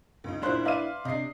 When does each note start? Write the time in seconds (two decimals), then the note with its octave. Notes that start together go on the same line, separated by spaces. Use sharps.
0.24 C#2 D#4
0.43 A#2 D4 E4 C5 F#6
0.65 B4 D5 E5 F5 C6 D#7
1.05 C3 D4 D#5 C7